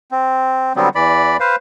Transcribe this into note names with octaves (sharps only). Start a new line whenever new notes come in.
C4
D3 F#3 G3 B3 C4
E2 E3 D5 B5
B4 C5 F5